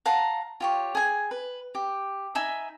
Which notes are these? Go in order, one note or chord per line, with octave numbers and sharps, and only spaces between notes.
F5 F#5 A5 A#5
F4 G4 C#5
G#4 G#5
B4
G4
D#4 E5 G#5 B5